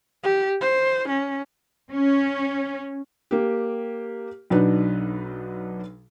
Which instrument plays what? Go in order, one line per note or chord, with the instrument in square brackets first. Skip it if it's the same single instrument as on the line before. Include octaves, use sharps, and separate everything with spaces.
[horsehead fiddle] G4
C5
C#4
[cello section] C#4
[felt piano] A#3 G4
B1 F#3 D4 D#4 B4